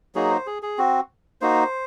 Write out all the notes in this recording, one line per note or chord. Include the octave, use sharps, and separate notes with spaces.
F#3 A#3 D#4 F#4 G#4
C5
G#4
G#4
C4 F#4
A#3 D#4 F#4 C5